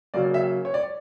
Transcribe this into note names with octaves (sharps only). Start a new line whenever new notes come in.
C#3 F#3 A#3 C#4 D5
E5
C#5
D5